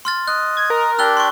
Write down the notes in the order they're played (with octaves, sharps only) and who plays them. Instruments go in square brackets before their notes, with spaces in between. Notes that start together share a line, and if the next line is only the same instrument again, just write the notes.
[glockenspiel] C6 F6 A6
[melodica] D#5 [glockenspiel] F#6
[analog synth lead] G#6
A#4
[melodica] D4 G4 D5 [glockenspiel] E6 F#6 G7
[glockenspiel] C6 C#6